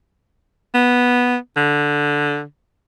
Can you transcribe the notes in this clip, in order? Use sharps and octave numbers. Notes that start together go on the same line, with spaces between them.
B3
D3